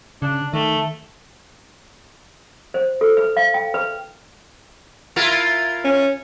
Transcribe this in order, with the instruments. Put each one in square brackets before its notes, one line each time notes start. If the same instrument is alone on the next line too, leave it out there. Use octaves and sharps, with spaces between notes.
[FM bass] C#3 [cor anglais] D4
[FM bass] D#3 [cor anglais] A3
[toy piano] C5
A4
B4
F5
G5
B4
[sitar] E4 F4 A#4
[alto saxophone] C#4